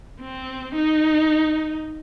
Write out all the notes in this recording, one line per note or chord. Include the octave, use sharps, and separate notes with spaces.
C4
D#4